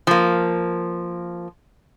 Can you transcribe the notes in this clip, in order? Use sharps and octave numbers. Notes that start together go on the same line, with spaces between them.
F3 A#3